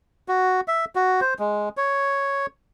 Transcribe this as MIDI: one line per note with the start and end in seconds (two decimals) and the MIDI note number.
0.28 0.61 66
0.68 0.85 76
0.95 1.20 66
1.21 1.34 72
1.39 1.69 56
1.77 2.46 73